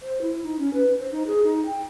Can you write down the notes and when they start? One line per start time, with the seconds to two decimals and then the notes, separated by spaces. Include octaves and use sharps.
0.01 C5
0.22 E4
0.43 D#4
0.59 C#4
0.74 B4
1.00 C5
1.12 D#4
1.27 G#4
1.43 D#4
1.66 G5